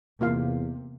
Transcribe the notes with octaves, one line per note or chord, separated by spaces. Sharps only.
E2 C3 A#3 F4 F5